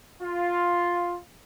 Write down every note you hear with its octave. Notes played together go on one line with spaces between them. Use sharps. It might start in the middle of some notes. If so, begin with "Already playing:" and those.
F4